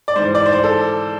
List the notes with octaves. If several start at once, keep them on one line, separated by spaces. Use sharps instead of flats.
D5
G#2 E3 C5
D5
C5
D5
A4